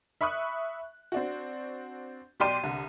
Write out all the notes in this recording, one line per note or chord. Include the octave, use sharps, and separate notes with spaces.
E5 B5 C#6 D#6 F#6
C4 D4 F#4
B1 G4 D5 G5 C6 D#7
C2 D3